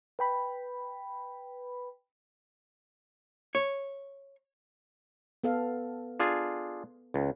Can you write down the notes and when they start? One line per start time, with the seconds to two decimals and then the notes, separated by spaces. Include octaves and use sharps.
0.19 B4 G5 B5
3.55 C#5
5.44 B3 A4 F5
6.20 D4 F4 G#4
7.14 C#2